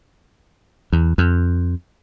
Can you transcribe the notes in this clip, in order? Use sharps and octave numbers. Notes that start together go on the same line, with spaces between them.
E2
F2